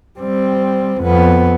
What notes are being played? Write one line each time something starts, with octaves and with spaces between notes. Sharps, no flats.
G3 C4
F2 B3